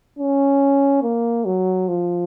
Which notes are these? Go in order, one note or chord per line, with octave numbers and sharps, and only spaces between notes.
C#4
A#3
F#3
F3